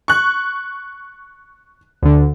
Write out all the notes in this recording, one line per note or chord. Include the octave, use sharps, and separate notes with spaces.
C#6 F#6
D2 D3